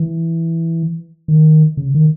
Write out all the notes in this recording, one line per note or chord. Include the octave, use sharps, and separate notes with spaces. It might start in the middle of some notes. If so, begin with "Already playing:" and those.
Already playing: E3
D#3
C#3
D#3